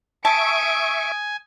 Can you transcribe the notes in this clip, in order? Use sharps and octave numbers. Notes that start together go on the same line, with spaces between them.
E5 G#5 A5 C#6 D#6 D7